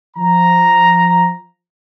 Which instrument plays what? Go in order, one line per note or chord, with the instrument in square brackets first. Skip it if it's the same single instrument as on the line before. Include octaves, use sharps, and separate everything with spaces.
[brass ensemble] F3 A#5